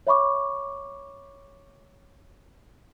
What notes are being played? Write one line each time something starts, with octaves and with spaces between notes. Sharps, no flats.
C#5 E5 B5 C#6 D6